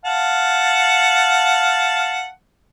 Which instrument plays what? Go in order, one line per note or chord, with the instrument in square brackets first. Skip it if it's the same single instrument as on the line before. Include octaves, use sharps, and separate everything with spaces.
[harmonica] F5 F#5 A5